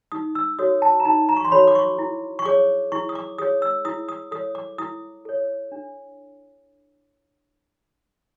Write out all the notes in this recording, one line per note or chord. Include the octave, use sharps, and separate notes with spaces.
D#4 D#6
E6
F#4 A4 C#5 D#6
A5
A#5
D#4 A5
A#5
C#6
C6
F#4 A4 C#5 B5
D6
C#6
E4
C#6
G#4 C#5 D6
E4 C#6
D#6
D6
G#4 C#5 D#6
E6
E4 D#6
D#6
A4 C#5 D#6
D6
E4 D#6
A4 C#5
D4